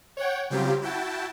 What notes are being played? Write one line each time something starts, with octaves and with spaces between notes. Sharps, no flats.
C#5 F#5 G5
C#3 F#3 G3 C4 F4 G4
E4 F#4 G5 A5